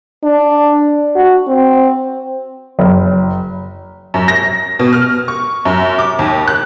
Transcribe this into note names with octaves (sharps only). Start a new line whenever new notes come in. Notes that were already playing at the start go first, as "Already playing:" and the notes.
D4
F#4
C4
F#1
F#2
A#6
B2
F6
C#6
F#2
D6
D#2
F#6